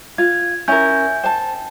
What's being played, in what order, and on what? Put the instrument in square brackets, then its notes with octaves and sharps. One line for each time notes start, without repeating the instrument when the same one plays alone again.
[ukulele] F4 [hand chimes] G#6
[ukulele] C#4 E4 A#4 [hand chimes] E5 G#5 G6
[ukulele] C5 A5 [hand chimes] G5